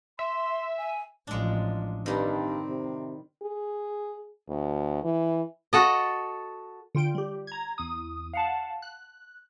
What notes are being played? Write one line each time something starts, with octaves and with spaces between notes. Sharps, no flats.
E5 C6
G#5
A1 F3 G#3 D4
G2 D#3 G3 C4
C3
G#4
D2
E3
F#4 A4 D#5
D3 F4 G5 D7
G3 G4
A#5 G#6
E2 D#6
F5 F#5 A5
F#6